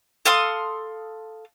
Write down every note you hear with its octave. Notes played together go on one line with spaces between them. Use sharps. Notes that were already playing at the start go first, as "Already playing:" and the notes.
A4 F5 C6 D#6